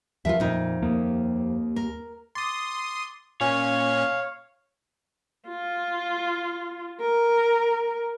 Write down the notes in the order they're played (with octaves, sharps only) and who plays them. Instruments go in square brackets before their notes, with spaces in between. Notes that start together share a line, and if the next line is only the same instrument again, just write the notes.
[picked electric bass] D#2 E3 F3 [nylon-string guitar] F4 A#4 E5
[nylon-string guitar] F2 D#4 [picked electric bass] A#2
[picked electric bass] D#2 A#3
[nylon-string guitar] A#4
[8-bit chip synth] C6 D#6 [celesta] D6 A6
[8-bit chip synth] A#2 C#4 [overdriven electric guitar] C#5 [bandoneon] F5 [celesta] G#5
[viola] F4
A#4